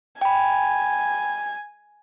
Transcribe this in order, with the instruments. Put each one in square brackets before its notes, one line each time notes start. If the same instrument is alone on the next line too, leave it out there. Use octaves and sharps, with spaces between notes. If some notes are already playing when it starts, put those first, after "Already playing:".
[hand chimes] G5 B5 [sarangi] G#5